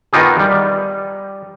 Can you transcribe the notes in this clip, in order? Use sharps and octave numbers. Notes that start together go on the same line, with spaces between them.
D#3 B3 D#4 F4 G4 G#4
G3